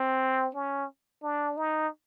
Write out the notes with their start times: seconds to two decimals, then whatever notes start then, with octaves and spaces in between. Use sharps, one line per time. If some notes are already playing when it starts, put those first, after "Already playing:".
Already playing: C4
0.55 C#4
1.23 D4
1.57 D#4